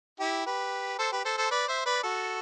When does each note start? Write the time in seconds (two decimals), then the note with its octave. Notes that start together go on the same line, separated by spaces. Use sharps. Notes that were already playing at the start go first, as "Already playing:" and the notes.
0.20 E4 G4
0.46 G4 B4
0.99 A4 C5
1.12 G4 B4
1.25 A4 C5
1.38 A4 C5
1.51 B4 D5
1.68 C5 E5
1.86 B4 D5
2.04 F#4 A4